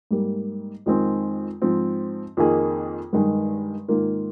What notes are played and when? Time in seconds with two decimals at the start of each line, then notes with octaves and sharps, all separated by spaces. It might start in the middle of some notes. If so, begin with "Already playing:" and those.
0.11 G#2 G3 A#3
0.86 F2 D#3 G#3 C4
1.62 G#2 F3 C4
2.37 F2 D#3 A#3 D#4 G#4
3.13 G2 D#3 G#3 D#4
3.88 G#2 D#3 A#3 F4